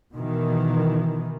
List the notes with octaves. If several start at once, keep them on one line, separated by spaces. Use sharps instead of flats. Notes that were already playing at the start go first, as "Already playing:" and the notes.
B2 D#3 E3